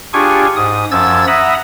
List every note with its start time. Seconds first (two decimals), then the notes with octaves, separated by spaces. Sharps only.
0.13 D4 F4 G4 G#4 G#5 C#6
0.56 G#2 D#6
0.91 F#2 F3 E6 G#6 A6
1.27 E5 F#5 A#5 B5 D#6